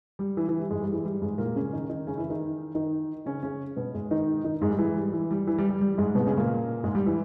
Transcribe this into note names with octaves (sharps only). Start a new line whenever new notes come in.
G3
E3
E3
G3
G#2 G#3
G3
E3
G3
G#2 G#3
A#2 A#3
C#3 C#4
D#3 D#4
D#3 D#4
C#3 C#4
E3 E4
D#3 D#4
D#3 D#4
C#3 C#4
C#3 C#4
B2 B3
G#2 G#3
D#3 D#4
D#3 D#4
G#2 G#3
G3
E3
G3
E3
G3
E3
G3
G3
G3
G#2 G#3
B2 B3
C#3 C#4
A#2 A#3
G#2 G#3
G3
E3